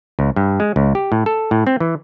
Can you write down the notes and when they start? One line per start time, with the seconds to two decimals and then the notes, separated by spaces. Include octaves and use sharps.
0.19 C#2
0.36 G2
0.60 G#3
0.76 C#2
0.95 G4
1.12 A2
1.26 A4
1.51 A2
1.67 C4
1.80 E3